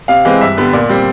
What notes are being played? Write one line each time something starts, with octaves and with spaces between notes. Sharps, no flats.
C3 F5
E3 G#3 C4
G2 E5
D3 G3 B3
A#2 D5
G3 C4